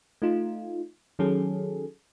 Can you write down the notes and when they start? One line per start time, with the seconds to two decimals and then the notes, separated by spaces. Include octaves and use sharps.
0.22 A3 D#4 F4
1.19 D#3 F#3 C#4 G#4 A4